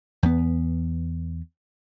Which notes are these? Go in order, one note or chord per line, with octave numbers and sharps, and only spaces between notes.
E2 B3